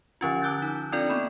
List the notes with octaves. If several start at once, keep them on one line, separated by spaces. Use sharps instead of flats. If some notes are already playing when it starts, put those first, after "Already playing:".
D3 F3 C#4 F4
A5 D6 E6 F#6 G6 A6
D#4
C4 D4 F4 A4 D5
A#3 B3 B5